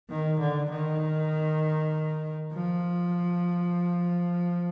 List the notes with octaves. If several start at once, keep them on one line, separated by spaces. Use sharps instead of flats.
D#3
D3
D#3
F3